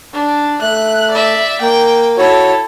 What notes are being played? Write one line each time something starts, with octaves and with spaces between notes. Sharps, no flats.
D4
A3 F#6
D5 E5
A#3 G5
E4 F#4 A4 C#5